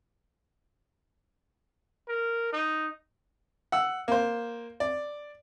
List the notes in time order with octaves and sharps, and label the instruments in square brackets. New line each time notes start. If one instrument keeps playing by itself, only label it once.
[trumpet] A#4
D#4
[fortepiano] F#5 E6
A#3 C5
D5